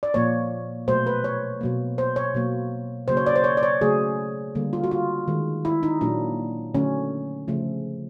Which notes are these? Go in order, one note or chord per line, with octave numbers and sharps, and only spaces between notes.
D5
A#2 F3 A#3 C#5
B2 F#3 A3 C5
B4
C#5
B2 F#3 A#3
C5
C#5
B2 F#3 A#3
C#3 F#3 A#3 C5
C#5
D5
C5
C#5
D5
C#5
C#3 F#3 A3 G#4
D3 G3 A#3
F4
F#4
F4
D#3 G#3
E4
D#4
A#2 F#3 A#3 D4
D3 F#3 A3 C#4
C#3 F3 A3